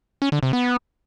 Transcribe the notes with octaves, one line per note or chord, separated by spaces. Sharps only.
C#4
D3
C3
B3